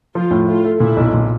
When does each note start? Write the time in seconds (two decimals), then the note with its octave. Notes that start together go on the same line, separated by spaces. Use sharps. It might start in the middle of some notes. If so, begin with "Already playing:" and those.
0.15 F3 F4
0.31 A2
0.47 A3 F4
0.64 A3
0.80 A#2 E4
0.96 B1
1.14 A#2